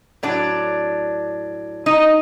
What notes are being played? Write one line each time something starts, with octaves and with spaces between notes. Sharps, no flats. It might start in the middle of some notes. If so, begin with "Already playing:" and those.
A2 F#3 D4 D5
D#4 D#5